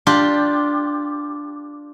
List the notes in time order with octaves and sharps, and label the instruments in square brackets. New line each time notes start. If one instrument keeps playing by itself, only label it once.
[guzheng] D4 F4 G4